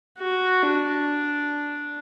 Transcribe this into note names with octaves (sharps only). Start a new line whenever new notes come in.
F#4
D4